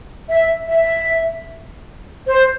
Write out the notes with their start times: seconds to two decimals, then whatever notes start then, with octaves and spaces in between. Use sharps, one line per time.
0.29 E5
0.68 E5
2.27 C5